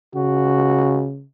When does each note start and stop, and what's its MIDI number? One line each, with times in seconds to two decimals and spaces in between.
0.15 1.24 49
0.15 1.07 66